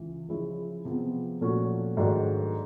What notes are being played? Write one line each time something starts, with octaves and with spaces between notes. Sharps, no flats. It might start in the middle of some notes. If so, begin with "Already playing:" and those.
Already playing: C#2 E3
C#3 F3 G#3 C#4 E4
C3 F3 G#3 B3
A#2 F3 A3 C#4 F#4
G#2 D#3 F#3 A3 D4